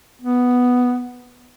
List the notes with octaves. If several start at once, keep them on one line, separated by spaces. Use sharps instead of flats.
B3